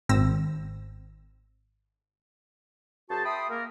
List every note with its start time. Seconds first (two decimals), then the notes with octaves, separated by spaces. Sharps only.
0.09 G#1 C4 E6 A#6
3.10 F#2 F#4 G#4 C5 A5
3.25 E5 G5 B5 C6 D#6
3.50 A#3 A#4